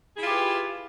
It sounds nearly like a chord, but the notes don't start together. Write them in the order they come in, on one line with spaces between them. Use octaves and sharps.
G#4 E4 F4 G4 B4